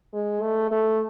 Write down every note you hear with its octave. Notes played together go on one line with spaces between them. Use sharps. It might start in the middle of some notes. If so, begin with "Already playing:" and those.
G#3
A3
A3